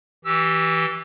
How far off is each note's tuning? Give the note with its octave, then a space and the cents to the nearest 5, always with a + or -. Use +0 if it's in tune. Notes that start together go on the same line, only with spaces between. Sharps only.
E3 -15 G4 -20 E6 +0